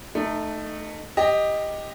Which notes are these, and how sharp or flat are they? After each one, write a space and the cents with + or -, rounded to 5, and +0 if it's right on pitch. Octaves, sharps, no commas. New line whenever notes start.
A3 +0 D#4 -20
G4 +10 D#5 +0